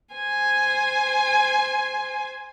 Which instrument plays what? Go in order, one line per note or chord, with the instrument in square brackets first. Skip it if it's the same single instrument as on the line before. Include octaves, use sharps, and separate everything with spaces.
[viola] C5 G#5